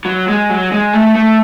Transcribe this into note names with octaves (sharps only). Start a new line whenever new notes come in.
F#3
G#3
F#3
G#3
A3
A3